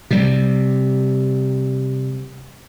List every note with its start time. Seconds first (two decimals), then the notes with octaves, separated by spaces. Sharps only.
0.11 C3 G3